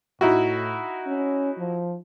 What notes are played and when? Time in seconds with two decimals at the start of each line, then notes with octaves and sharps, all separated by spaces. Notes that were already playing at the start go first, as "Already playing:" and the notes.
0.21 A2 D#4 E4 F#4
1.06 C#4
1.58 F3